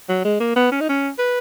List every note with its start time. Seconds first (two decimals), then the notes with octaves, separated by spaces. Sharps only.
0.09 F#3
0.25 G#3
0.40 A#3
0.56 B3
0.72 C#4
0.81 D#4
0.89 C#4
1.19 B4